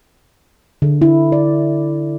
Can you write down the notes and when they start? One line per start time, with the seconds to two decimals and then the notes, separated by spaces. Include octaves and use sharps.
0.82 D3
1.02 E4
1.32 D5